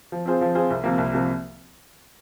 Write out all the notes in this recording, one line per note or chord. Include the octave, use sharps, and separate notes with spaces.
F3
C4 F4 G#4 C5
F3
C4 F4 G#4 C5
C2
C3 F3 A#3
C2
C3 F3 A#3